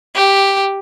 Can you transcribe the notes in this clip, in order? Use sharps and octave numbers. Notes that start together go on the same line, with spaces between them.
G4